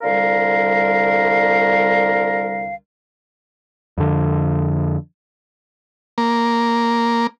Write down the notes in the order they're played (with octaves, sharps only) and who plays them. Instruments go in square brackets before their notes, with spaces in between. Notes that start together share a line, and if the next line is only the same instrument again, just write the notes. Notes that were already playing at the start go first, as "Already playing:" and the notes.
[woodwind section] C2 D3 G3 A#4 F5
[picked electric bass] F2 D3
[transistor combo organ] A#3